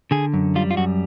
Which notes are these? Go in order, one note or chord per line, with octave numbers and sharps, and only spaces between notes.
D3 G#4
F#2
G3 F4
F4
F#2 F#4